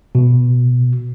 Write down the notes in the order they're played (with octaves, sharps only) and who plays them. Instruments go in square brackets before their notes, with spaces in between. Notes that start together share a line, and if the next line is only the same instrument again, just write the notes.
[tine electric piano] B2